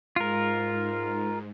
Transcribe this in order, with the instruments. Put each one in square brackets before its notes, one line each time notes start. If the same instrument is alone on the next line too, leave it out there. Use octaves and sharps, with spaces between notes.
[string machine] G#2 [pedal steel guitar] F4 A#4